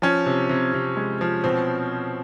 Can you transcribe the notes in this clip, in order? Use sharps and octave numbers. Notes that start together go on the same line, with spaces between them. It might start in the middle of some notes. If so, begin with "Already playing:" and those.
F3 C#4
C3
C3
C3
G#3
F3
B2 C4